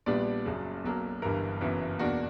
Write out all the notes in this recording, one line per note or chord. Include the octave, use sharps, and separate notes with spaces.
A#1 A#2 G3 B3 D4 D5
F#1 F#2 C#3 F#3
B1 B2 F#3 A#3
G1 G2 E3 A#4
F#1 F#2 E3 B3
E2 B2 A#3 D4 F#4